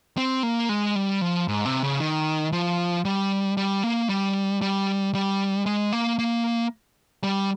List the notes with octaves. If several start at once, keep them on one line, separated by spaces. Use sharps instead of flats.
C4
A#3
G#3
G3
F3
G#2
C3
C#3
D#3
F3
G3
G3
A#3
G3
G3
G3
G#3
A#3
A#3
G3